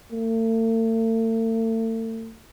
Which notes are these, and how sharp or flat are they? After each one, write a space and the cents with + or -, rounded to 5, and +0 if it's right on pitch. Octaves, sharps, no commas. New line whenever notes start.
A3 +40